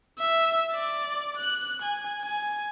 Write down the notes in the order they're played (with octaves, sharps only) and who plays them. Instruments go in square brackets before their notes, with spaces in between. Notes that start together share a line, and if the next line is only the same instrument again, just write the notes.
[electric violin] E5
D5
F#6
G#5
G#5